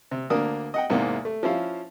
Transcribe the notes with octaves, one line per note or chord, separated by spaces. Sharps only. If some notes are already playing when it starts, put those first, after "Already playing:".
C3
D2 A#3 D4 A#4 D#6
D#5 F#5 G5
E2 G#2 C3 A#3
A3
F3 C#4 E4 F5